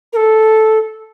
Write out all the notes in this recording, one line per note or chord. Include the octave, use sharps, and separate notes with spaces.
A#4
A4